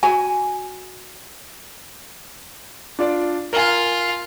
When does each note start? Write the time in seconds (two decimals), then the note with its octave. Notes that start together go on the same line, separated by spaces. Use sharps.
0.03 F#4 G#5
2.99 D4 F4 D5
3.53 F4 A#4 G#5